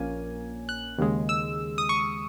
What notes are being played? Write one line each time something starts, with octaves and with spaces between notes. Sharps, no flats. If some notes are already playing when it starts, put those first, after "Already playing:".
Already playing: A#1 A#2 A#3 C#4 G#5
F#6
D#2 C#3 G#3
E6
D#6
C#6